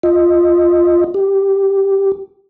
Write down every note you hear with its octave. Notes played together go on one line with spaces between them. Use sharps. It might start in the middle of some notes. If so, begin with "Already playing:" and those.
F4 D#5
G4